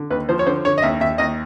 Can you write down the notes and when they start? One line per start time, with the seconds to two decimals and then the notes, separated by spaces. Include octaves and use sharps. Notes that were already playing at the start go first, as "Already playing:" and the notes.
Already playing: D3
0.10 D#2 B4
0.29 F3 C5
0.39 C#5
0.47 D3 C5
0.65 D3 C#5
0.78 D#5
0.82 D#2 E5
1.00 D#2 E5
1.18 D#2 D#5